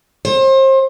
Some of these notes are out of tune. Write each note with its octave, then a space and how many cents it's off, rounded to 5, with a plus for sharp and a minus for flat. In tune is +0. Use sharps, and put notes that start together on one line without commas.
C5 +30